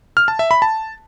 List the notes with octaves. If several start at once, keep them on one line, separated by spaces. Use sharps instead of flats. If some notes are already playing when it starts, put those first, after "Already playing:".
F6
A5
E5
B5
A5